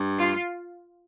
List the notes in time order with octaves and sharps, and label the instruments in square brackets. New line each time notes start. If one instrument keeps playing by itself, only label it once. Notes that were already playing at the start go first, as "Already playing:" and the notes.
Already playing: [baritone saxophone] G2
[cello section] F4